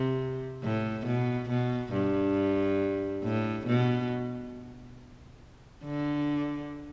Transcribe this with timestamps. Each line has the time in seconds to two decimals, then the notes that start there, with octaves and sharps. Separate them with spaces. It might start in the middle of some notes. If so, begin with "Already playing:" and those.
Already playing: C3
0.63 A2
1.06 B2
1.49 B2
1.93 G2
3.23 A2
3.67 B2
5.84 D3